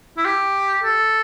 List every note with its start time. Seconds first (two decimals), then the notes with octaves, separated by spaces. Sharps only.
0.17 E4
0.25 G4
0.84 A4